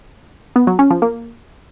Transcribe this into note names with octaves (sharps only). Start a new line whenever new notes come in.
B3
F#3
C#4
F3
A#3